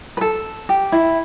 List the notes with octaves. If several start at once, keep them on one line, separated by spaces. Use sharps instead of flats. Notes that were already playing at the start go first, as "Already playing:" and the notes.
B4
A4
G4
E4